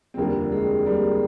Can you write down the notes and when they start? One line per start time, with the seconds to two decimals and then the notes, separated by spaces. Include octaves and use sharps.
0.14 C4
0.17 F1 D#2 D3 F3 G3 A#3
0.52 G#3
0.86 G3 A#3